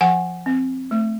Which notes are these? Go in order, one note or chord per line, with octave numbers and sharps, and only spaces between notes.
F3 F#5 G#5
C4
A3